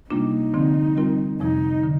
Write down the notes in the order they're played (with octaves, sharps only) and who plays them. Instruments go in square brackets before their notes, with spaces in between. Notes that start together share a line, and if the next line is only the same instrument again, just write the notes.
[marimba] C3 G3 A#3 D4 F4 [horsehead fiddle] D#4
[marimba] D3 F3 C4
G3 C4 F4 A#4
[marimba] F2 C3 F3 [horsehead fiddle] D#4
[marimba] D3